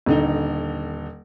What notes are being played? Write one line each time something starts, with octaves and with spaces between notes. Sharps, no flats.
D#1 D3 D#4